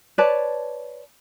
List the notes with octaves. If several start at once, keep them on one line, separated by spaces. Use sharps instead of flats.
B4 C#5 D5 A5